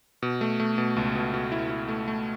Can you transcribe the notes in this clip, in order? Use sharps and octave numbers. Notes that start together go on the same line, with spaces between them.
B2
A3
A3
B2
C#2
B2
B2
E4
E4
A3
A3